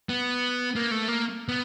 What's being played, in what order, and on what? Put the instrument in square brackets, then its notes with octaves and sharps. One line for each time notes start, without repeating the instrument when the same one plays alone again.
[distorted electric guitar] B3
A#3
A3
A#3
B3